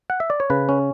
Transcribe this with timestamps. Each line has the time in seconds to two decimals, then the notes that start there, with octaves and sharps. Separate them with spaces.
0.10 F#5
0.20 E5
0.30 D5
0.40 C#5
0.50 C#3 B4
0.69 C#4